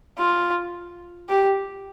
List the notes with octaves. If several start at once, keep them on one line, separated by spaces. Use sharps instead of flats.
F4
G4